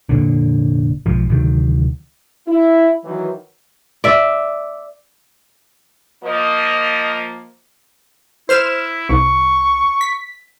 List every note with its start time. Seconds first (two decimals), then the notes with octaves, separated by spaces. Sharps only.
0.09 F1 C2 A#2 D3
1.06 B1 G#2 F3
1.29 D2 C3 D#3 F#3
2.48 E4
3.05 D#3 E3 F#3
4.04 D5 E5
6.24 F3 A#3 D#5
8.49 E4 C5 F6 E7
9.09 C2 C#6
10.01 B6